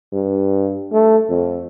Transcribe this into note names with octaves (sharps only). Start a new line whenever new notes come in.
G2
A3
F2